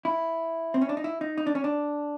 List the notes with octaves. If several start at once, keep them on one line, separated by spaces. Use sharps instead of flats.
E4
C4
C#4
D4
D#4
E4
D#4
D#4
D4
C#4
D4